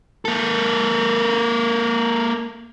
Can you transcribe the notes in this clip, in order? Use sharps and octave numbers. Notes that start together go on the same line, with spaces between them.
A#3 A4